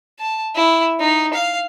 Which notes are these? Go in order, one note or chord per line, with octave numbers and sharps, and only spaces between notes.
A5
E4
D#4
F5